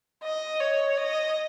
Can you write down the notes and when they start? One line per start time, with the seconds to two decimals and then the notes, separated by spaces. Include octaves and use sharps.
0.23 D#5
0.60 C#5
0.98 D#5